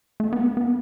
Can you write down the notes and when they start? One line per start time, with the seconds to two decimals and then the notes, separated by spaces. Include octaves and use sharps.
0.20 A3
0.33 B3
0.57 B3